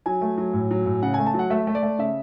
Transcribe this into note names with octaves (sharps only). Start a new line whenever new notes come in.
F#3 G#5
A3
F#3
A2
F#3
A2
C#3 F#5
A3 G#5
A5
F#3
F#5
A3 E5
A3
D5
A3
C#3 E5